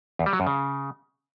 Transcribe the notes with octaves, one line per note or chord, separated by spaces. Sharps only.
E2
G3
F#3
F#2
C#3